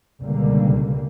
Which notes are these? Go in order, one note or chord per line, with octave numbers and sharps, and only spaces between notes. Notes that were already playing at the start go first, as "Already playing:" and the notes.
C#2 B2 D3 G3 A#3